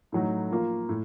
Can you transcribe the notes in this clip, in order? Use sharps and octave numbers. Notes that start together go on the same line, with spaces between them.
A2 F#3 A3 D#4 F#4
F3 A#3 F4
A2